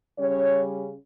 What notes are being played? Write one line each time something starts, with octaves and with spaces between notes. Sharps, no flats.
C#3 G3 C#4 C#5